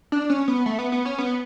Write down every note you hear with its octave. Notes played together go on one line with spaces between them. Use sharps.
D4
C#4
B3
A3
B3
B3
C#4
B3